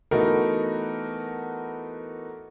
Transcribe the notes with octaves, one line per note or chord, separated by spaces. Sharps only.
E3 A3 B3 D#4 F#4 A#4